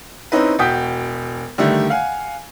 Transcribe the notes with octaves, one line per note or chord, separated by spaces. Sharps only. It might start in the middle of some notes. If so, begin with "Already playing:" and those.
C4 C#4 D#4 E4 B4
E1 F#4 G5 D#6 G6 B6
D3 D#3 G3 A3
F5 F#5 G#5